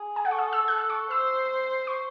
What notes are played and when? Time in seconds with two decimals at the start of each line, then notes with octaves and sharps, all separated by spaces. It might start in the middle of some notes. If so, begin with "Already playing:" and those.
Already playing: G#4
0.16 G#5
0.24 A4 F#5
0.31 C#6
0.39 D#6
0.53 E6
0.68 F#6
0.78 E6
0.90 C#6
1.11 C5 E6
1.87 C#6